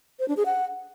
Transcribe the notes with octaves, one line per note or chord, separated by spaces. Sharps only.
C5
D4
G#4
F#5